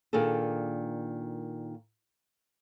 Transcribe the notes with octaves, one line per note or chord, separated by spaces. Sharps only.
A#2 D#3 D4 G#4 A4